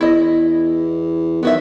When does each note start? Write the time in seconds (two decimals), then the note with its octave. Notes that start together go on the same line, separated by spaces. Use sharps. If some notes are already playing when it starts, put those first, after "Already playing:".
0.01 E2 E4 D#5
1.43 D#3 B3 F#4 E5